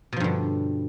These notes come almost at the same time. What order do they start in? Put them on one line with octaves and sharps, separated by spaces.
B2 F3 G2 D3